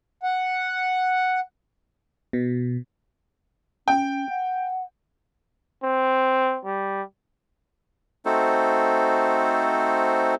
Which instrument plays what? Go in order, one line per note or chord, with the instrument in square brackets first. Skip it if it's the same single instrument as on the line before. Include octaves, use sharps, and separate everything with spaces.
[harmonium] F#5
[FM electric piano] B2
[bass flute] C#4 [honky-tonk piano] G5
[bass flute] F#5
[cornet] C4
G3
[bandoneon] A3 C4 D#4 F#4 A4 C5